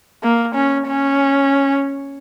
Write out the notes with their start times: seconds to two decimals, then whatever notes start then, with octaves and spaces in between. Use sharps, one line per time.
0.23 A#3
0.55 C#4
0.87 C#4